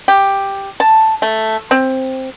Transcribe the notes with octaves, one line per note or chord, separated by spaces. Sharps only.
G4
A5
A3
C4